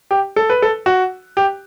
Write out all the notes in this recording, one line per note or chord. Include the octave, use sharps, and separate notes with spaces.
G4
A4
B4
A4
F#4
G4